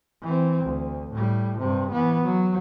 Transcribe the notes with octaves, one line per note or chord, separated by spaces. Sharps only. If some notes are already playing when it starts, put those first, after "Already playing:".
E3 C4
D2
A2 G3
G2 C3
E3 B3
F#3